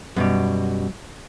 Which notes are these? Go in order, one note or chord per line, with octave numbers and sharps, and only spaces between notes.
F#2 B2 G3